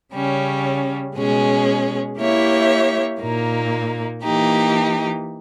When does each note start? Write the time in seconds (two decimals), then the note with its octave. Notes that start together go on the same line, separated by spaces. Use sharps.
0.13 C#3 G3 C#4
1.15 B2 G#3 C#4 G#4
2.18 A#3 E4 G4 C#5 E5
3.21 A#2 A#3 D#4
4.24 E3 A#3 D#4 G4